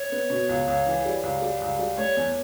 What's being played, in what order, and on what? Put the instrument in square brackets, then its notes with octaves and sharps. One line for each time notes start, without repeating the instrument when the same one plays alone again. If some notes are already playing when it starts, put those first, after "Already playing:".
Already playing: [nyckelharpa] C#5
[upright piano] B3
B2
C#2
C#2
E3
G3
C#2
G3
C#2
G3
[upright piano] A3 [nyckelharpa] C#5
[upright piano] E2